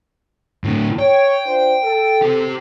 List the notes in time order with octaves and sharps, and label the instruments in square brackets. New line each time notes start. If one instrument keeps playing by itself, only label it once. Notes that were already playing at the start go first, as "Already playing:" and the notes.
[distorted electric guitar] A2 D3
[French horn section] C#5 [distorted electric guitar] G5
[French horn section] D4 F4 C5
A4
[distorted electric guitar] G4 C5